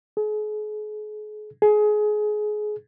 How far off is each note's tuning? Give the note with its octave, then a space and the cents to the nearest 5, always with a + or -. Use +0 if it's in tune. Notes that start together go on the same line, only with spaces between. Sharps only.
G#4 +40
G#4 +25